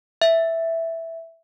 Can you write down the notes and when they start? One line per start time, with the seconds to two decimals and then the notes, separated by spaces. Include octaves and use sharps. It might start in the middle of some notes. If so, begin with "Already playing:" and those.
0.22 E5